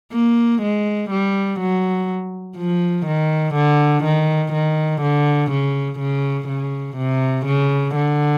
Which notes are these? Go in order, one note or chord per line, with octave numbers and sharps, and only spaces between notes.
A#3
G#3
G3
F#3
F3
D#3
D3
D#3
D#3
D3
C#3
C#3
C#3
C3
C#3
D3